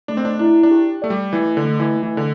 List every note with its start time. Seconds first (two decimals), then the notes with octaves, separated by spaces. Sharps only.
0.08 A3 D4
0.17 C4
0.25 D4
0.39 D4 E4
0.63 D4
0.71 G4
1.02 A3 D5
1.10 G3
1.33 E3 A3
1.57 D3
1.64 A3
1.80 E3
1.96 A3
2.03 E3
2.17 D3